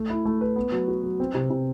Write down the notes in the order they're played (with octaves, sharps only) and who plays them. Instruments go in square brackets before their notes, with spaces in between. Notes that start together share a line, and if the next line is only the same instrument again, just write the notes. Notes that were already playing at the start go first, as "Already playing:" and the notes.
Already playing: [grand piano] A3
E4
A3
B4
B3
F#3
F#4
F#3
C4
C3
C3